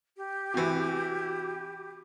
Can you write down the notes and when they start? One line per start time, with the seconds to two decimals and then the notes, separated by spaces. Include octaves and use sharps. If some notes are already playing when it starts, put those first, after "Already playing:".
0.17 G4
0.54 C3 E3 F#4